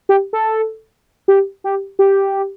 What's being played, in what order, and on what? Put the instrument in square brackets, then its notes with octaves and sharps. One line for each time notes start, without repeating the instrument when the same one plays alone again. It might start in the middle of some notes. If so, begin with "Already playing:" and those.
[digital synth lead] G4
A4
G4
G4
G4